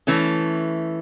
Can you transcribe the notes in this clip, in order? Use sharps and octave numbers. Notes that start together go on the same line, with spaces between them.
E3 A3 C#4